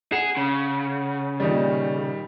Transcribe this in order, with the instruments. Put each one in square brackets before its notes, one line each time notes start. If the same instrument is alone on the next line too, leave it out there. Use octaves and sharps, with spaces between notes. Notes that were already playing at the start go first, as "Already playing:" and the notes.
[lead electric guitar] G#4 [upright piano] F#5 C7 E7
[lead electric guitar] C#3
[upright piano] A#2 D#3 G3